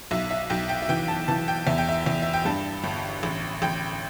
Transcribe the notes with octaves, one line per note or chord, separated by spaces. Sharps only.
B1 E5
E5
B1 G5
G5
E5
E3 G5
A5
E3 A5
G5
E2 E5
G5
E5
E2
E5
G5
G2 A5
G1
A1
A1 G5